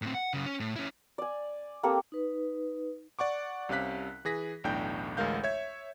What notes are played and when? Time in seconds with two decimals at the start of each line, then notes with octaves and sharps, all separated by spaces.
0.02 A2 C4
0.14 F#5
0.34 F#2 C#3
0.46 C#4
0.60 A2
0.76 C#4 E4
1.18 D5 G#5
1.83 A#3 C4 G4 A4
2.12 D#4 B4
3.19 D5 F#5 C#6 D6
3.69 C2 C3 C#4 F5 F#6 B6
4.25 E3 G#4 A#6 B6
4.64 B1 E2 A2 D4 G5 G6
5.17 A1 D2 G#3 A#4 F5 G6
5.44 C#5 E5 G#6